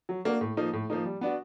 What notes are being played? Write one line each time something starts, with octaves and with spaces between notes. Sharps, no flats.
F#3
A#3 D4 F#4 A#4
A2
F3 A#3 D#4
A2
F3 A#3 D#4
G3
B3 D4 F#4